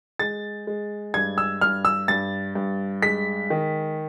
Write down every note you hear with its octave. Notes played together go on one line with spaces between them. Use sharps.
G#3 A6
G#3
G2 G#6
E6
G2 F6
E6
G2 A6
G2
G#3 B6
D#3